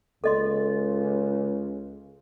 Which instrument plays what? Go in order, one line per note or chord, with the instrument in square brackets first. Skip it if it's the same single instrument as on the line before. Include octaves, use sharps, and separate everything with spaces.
[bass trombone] C#2 [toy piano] A4 D#5 C6